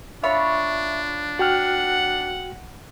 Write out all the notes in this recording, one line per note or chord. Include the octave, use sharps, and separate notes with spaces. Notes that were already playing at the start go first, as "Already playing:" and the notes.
D4 F4 C#5 E5 B5
F#4 F#5 G5 F6